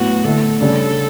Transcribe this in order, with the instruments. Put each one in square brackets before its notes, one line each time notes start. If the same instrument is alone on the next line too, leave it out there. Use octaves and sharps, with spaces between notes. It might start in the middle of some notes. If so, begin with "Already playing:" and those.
Already playing: [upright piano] A2 F#3 B3 [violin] F#4
[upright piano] D3 A3 E4 [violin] A4
[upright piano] C#3 G3 D4 [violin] A4